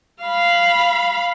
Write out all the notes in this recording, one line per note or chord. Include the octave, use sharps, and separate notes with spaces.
F5 B5